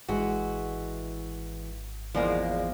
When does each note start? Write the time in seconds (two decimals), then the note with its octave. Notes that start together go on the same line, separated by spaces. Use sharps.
0.08 G#1 E3 G#3 F#4
2.15 E2 F3 G#3 A#3 D5